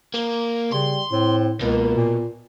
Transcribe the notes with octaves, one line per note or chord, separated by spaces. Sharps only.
A#3
C#3 G3 C6
A2 C4
C#2 B2 A#3
A#2